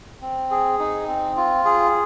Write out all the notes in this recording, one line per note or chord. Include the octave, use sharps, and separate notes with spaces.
C4
G#4
D#4
C4
F4
G#4